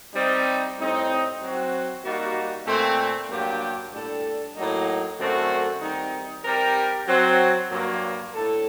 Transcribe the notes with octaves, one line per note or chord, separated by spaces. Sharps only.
G3 C4 D#4
A2 G3 C4 D#4
F#3 C4 F#4
G3 A#3 D#4 F#4
A#2 A3 C4
G2 F#3 A#3 D4 G4
A2 G3 D4 A4
A2 F#3 A#3 D#4
F#2 D3 A3 C4 F#4
D#3 G3 C4 D#4
G3 C4 G4 A#4
F#3 C4 F#4
G2 F#3 A#3
A2 A3 D4 A4